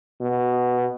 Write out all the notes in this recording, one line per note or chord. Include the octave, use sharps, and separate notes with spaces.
B2